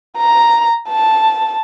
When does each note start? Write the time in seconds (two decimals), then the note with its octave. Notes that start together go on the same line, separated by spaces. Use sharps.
0.18 A#5
0.89 A5